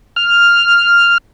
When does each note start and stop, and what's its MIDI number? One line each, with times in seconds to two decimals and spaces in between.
0.16 1.18 89